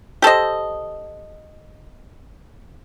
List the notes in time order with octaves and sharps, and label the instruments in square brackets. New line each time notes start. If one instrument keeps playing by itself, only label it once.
[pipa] G4 A4 C5 D#5